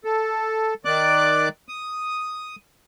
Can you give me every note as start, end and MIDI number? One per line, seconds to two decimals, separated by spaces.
0.04 0.74 69
0.85 1.49 51
0.85 1.49 74
0.85 1.49 86
0.85 1.49 90
1.69 2.56 87